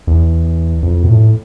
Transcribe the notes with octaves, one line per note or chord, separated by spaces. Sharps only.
E2
F2
B2
A2